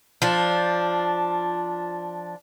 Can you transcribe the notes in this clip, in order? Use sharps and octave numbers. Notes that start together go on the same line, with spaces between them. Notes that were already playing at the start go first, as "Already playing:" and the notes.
F3 D4